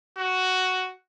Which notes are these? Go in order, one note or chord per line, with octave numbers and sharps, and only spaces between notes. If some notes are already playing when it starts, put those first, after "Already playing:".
F#4